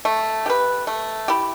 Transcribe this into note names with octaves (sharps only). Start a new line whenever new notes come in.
A3
G4 B4
A3
E4 G4